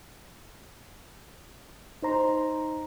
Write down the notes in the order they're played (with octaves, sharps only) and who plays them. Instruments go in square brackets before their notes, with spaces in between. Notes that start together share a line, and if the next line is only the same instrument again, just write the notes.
[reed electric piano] D#4 C5 A#5 C6